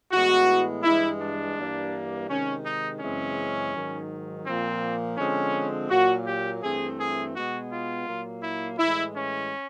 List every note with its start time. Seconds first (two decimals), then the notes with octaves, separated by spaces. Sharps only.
0.11 A2 E3 G#3 B3 F#4
0.83 G2 E3 G#3 E4
1.20 D4
1.56 G2 E3 G3 A#3
2.28 C3 D#3 G#3 C#4
2.64 D#4
3.00 F#2 C#3 E3 G#3 C4 C#4
3.73 G#2 D#3 F#3
4.45 A#2 F3 A#3 C4
5.17 D3 F3 G#3 C4 C#4
5.89 A#2 F#3 A#3 F#4
6.25 G4
6.62 G2 E3 A3 C4 G#4
6.98 G#4
7.34 B2 G#3 B3 F#4
7.71 F4
8.06 A#2 F#3 A#3
8.43 E4
8.78 A2 E3 G#3 E4
9.16 C#4